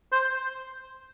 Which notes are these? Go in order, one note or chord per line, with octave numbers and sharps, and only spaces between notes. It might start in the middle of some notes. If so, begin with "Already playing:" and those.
C5